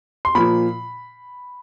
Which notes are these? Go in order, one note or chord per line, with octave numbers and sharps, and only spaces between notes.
C6
A#2 F3 B5